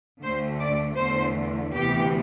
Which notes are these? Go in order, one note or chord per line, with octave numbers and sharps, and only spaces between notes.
D2 D3 A3 C5
D5
E2 D3 A3 C5
D2 C3 E3 B3 G4